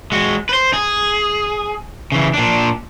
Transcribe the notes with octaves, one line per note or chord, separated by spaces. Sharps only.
G#3 F#4
B4 C5
G#4
C#3 E3
A#2 D4